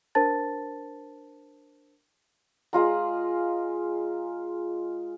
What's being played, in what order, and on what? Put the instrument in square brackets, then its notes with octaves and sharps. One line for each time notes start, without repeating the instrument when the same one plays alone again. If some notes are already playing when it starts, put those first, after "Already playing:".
[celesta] D4 A#4 C5 A5 A6
[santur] G#3 F4 A#5